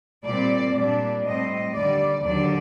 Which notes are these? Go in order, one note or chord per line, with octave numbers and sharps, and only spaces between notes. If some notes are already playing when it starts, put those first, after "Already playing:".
A#2 G3 C4 D5
A#2 G3 D4 D5
A2 G3 C4 D#5
D#2 D3 G3 D5
D#2 D3 F#3 D5